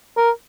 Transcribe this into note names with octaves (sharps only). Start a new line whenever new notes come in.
A#4